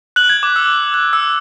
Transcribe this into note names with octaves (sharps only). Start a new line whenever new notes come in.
F#6 F#7
G#6
D6
E6
F#6
E6